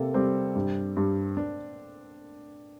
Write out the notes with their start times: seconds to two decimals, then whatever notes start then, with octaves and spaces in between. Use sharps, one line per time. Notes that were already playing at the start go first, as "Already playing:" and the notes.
Already playing: C3 A#3 A4
0.14 G3 C4
0.55 G2
0.97 G2
1.37 D4